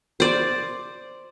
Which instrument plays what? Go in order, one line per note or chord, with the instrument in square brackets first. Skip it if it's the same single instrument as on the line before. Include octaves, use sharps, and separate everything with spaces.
[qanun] C5 D5